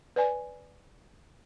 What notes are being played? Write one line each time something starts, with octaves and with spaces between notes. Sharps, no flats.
B4 D5 G#5